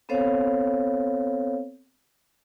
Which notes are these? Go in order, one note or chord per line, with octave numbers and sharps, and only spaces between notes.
B3 C4 A4 C5 C#5 F5